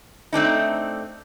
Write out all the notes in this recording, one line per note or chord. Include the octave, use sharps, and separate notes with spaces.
A3 C4 D4 D#4